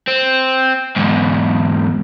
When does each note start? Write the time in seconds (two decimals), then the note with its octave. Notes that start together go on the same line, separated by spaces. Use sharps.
0.08 C4
0.96 E2 G#2